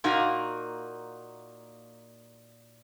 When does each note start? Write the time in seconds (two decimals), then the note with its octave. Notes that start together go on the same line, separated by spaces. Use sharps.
0.04 A#2 A#3 D#4 F#4